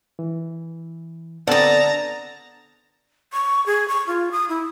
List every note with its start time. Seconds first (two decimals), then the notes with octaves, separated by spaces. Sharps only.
0.19 E3
1.47 D3 B3 C4 A4 D5 A5 A#5 D#6
3.33 C#6
3.66 G#4
3.88 C#6
4.07 F4
4.32 D#6
4.49 E4